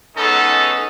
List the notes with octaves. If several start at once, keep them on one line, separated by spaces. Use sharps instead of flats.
G#3 B3 C#4 D#4 A4